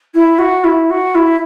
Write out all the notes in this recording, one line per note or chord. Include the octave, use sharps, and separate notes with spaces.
E4
F#4
E4
F#4
E4